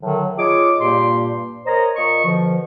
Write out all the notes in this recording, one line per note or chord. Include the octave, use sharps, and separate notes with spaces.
A2 D3 D#3 F#3
D#4 F4 G#4 C#5 D6
G2 A#2 A#3 G4 C6
A#4 C5 C#5 D#5 A#5
A#2 D#5 C#6
B2 D3 F3